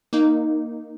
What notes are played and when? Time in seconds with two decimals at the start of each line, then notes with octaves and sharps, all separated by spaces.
0.13 A#3 D#4